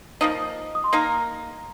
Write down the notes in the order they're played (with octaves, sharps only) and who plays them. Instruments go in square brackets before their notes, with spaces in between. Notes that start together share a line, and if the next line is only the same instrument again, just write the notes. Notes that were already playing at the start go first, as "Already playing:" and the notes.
[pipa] F3 A#3 D#4 [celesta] D#6
[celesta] D#6
C6
[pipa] A#3 D#4 A#4 [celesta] A#5